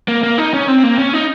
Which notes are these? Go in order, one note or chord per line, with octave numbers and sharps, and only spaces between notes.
A#3
A#3
D#4
C#4
C4
A#3
C#4
D#4